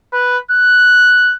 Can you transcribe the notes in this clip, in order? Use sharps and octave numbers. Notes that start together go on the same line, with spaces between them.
B4
F#6